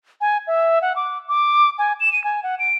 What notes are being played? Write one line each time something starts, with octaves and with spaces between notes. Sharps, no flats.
G#5
E5
F#5
D6
D6
G#5
E7
D#7
G#5
F#5
D7